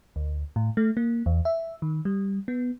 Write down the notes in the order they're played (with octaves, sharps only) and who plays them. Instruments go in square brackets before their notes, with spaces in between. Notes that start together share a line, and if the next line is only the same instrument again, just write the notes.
[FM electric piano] D2
A2
A3
A#3
E2
E5
D#3
G3
B3